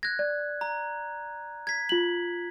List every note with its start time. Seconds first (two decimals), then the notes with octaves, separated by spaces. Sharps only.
0.03 F#6 G#6 A#6
0.19 D5
0.61 A#5
1.67 G#6 B6
1.89 F4 F#7